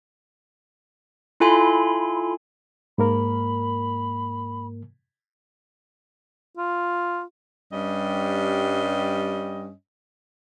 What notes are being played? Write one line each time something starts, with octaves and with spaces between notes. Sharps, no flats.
E4 F4 A4 G#5 B5 C6
G#2 A#3 A#4 B5
F4
G2 G3 C#4 D#5